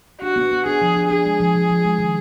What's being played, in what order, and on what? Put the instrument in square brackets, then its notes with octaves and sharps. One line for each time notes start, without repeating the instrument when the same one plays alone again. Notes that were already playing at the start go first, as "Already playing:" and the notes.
[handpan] D4 [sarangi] F#4
[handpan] B3
B3
[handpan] D4 [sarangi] G#4
[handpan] F3
D4
[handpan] D4 [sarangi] G#4
[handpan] G#3
F3
F3
F3
G#3
D#3